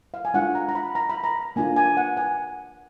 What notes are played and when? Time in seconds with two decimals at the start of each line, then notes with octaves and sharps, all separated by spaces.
0.14 F5
0.25 G#5
0.34 G#3 D4 F4 F#5
0.55 A#5
0.69 A#5
0.75 B5
0.95 A#5
1.10 B5
1.24 A#5
1.56 A#3 D4 F4 G#5
1.76 G#5
1.97 F#5
2.17 G#5